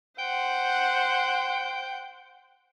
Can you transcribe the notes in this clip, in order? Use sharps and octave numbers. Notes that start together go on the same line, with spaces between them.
C5 F#5 G5